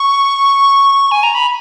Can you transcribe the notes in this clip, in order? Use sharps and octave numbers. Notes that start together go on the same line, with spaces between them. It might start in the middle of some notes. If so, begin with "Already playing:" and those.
Already playing: C#6
G#5
A#5
B5